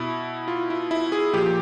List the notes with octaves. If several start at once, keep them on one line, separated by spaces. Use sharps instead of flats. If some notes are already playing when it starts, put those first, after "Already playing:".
Already playing: B2 E4
F4
E4
E4
G#4
A#2 F3 G4